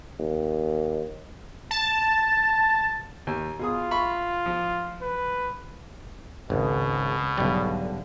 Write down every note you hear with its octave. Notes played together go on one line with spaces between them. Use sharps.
D#2
A5
D#2
B2 F4 G#4 D#6
E5 B5 C#6
F3
B4
G#1 C#2 B2
B1 G#2 D3 G3